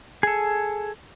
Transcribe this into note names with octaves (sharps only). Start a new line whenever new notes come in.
G#4 A4